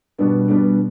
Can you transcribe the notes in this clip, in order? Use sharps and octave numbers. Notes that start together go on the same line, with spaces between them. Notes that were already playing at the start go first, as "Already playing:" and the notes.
B2 G3 B3 D4
B2 G3 B3 D4